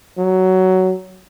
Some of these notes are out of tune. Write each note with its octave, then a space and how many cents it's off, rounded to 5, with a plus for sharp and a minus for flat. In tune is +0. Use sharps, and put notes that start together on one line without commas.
F#3 +10